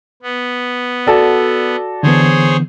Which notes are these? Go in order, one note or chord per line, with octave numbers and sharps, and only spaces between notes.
B3
F#4 A4 D5
D3 E3 B3 G#4 C5 C#5